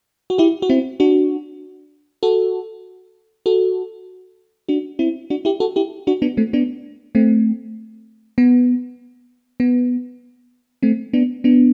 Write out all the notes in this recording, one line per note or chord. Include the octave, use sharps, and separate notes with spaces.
F#4
E4 G4
F#4
C4 E4
D4 F#4
F#4 A4
F#4 A4
D4 F#4
C4 E4
D4 F#4
E4 G4
F#4 A4
E4 G4
D4 F#4
B3 D4
A3 C4
B3 D4
A3 C4
B3
B3
A3 C4
B3 D4
B3 D4